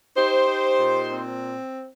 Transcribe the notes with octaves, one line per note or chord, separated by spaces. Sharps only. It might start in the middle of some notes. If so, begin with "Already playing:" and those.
D#4 G4 C5
D#4
A#2
C4